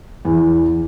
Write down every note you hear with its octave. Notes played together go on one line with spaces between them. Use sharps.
E2